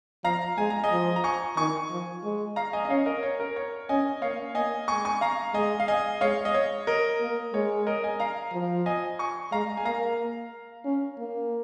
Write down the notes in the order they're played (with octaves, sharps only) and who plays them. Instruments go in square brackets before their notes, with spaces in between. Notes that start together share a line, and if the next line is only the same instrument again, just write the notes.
[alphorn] F3 [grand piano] F5 A#5
[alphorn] G#3 [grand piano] G#5
[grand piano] A#5
D#5 G#5
[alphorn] F3
[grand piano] A#5
G#5 C#6
[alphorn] D#3 [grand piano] G#5 C#6
[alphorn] F3
G#3
[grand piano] F5 A#5
D#5 G#5
D#5
[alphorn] C#4 [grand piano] C#5 F5
[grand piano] A#4 D#5
C#5
A#4
C#5
[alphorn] C#4 [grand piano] D#5 G#5
[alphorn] A#3 [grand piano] C#5 F5
[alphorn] A#3 [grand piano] D#5 G#5
[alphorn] G#3 [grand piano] G#5 C#6
[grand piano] G#5 C#6
F5 A#5
[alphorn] G#3 [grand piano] D#5 G#5
[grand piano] F5
D#5 G#5
[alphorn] G#3 [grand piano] C#5 F5
[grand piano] D#5
C#5
A#4 D#5
[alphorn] A#3
[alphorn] G#3 [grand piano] C#5
[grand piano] A#4 D#5
D#5 G#5
F5 A#5
[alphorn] F3
[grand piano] D#5 G#5
G#5 C#6
[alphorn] G#3 [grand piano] F5 A#5
[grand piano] G#5
[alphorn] A#3 [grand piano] F5 A#5
[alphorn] C#4
A#3